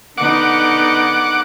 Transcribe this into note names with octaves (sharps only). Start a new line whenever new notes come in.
D3 B3 D#4 F#5 D6